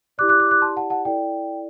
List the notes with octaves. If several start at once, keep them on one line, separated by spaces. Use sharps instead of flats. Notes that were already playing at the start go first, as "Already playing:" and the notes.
E4 G4 D5 D6 F#6
D6 F#6
D6 F#6
D6 F#6
A5 C6
F#5 A5
F#5 A5
E4 A4 D5 G5